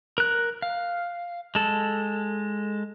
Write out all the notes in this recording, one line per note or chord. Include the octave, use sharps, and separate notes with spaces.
A#4 F#6
F5
G#3 A4